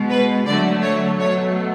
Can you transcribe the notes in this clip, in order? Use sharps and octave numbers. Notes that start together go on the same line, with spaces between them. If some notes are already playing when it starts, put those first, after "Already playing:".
Already playing: B2 G#3
B4
D3 F#3 A3 D5
C#5
B2 F#3 A3 C#5